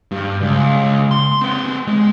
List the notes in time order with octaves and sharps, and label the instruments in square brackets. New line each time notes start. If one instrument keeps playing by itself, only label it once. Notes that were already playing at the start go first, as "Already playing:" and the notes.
[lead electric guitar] G2
C#2
C6
C4 B4
G#3